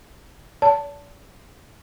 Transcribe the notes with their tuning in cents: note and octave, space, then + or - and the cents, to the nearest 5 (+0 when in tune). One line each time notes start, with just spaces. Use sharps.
D5 -40 A5 +10